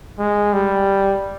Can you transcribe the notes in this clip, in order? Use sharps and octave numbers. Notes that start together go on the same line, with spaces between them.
G#3
G3